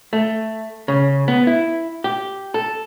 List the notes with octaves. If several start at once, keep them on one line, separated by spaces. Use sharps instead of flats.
A3
C#3
B3
E4
G4
A4